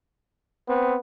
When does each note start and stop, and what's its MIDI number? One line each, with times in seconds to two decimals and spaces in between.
0.68 0.98 59
0.68 0.95 60